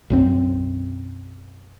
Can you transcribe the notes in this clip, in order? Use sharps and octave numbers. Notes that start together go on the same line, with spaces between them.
B1 F#2 C4